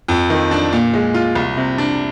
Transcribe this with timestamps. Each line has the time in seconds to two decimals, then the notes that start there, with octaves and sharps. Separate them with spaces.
0.08 F2
0.30 D#3
0.51 D4
0.73 A#2
0.93 G#3
1.14 F4
1.35 C2
1.57 C3
1.78 D4